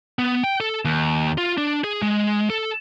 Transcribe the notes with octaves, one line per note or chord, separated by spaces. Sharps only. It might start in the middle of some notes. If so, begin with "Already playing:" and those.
B3
G5
A4
D#2
F4
D4
G#4
G#3
A4